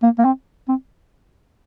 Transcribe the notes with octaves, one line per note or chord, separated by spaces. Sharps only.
A#3
A#3
C4
C4